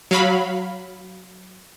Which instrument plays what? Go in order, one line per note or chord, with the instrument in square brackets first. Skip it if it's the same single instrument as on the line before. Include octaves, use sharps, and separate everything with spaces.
[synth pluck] F#3 F5 B5